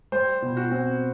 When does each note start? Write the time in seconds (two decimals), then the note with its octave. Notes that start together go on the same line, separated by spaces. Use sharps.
0.12 G3 C5
0.42 B2
0.57 F#4
0.71 C4